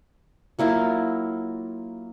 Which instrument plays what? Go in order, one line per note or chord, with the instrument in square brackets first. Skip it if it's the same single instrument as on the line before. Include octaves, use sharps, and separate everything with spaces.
[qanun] F#3 A#3 E4 F4